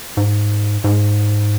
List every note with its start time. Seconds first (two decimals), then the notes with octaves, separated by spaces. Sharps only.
0.17 G#2
0.84 G#2